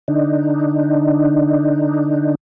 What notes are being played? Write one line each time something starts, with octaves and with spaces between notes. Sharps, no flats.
D3 D4 D#4